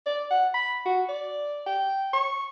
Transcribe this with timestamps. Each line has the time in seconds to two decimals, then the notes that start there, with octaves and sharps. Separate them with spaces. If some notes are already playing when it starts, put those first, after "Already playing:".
0.06 D5
0.31 F#5
0.54 B5
0.86 F#4
1.09 D5
1.67 G5
2.13 C#6